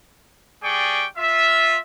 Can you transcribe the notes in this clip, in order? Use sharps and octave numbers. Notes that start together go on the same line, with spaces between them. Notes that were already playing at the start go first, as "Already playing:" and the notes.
G3 G#4 D5 G5 C#6 D6
F4 E5